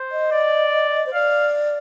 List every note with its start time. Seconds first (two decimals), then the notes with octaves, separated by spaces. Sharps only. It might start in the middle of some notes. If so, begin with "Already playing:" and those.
Already playing: C5
0.12 D#5
0.32 D5
1.06 C5
1.14 D5 F5